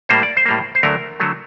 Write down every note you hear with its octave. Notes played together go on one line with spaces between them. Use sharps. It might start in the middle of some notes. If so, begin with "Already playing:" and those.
A2 G3 A#3 C5
D5
C5
A2 G3 A#3
C5
D2 D3 F#3 A3 A#4
D3 F#3 A3